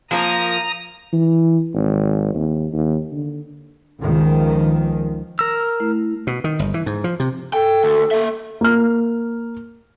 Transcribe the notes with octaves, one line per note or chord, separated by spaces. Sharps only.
F3 A#3 A#5 D#6
E3
G#1
D#2
D#2
D3
C#2 D#3 F3
A#4 E6
A3 E4
B2
D#3
G1
E3
G#2
F3
C3
A4 G5
D2
A#3 E5
A#3 F6